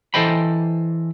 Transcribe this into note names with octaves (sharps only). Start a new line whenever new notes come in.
E3 A4 C5 D#5 G5 B5